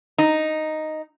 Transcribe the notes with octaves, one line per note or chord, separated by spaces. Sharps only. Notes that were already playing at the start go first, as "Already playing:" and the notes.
D#4